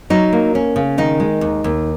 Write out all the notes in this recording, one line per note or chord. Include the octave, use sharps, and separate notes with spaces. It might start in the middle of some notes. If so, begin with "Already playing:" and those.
F#3 D#4
A#3
C#4
C#3
D#3 D#4
G#3
D#2
D#2